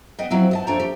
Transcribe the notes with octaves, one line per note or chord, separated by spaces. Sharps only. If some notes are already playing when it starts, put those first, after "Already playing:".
G3 B3 D#5 G5
F3 F#3 C4 E4
B3 D#5 A5
F2 A3 D4 C#5 G5 A#5
G4